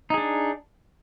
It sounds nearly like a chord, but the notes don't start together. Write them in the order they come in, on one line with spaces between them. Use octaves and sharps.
D#4 G#4 D4